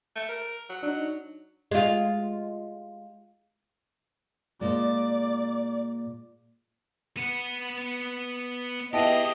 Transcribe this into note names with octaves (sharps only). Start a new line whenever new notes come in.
A3
A#4
F#3
F#3 D4 D#4
G#3 F4
A#2 G#3 D5
B3 F#5 D#7
B3 E4 G4 G#4 D#5 G5 A5 D7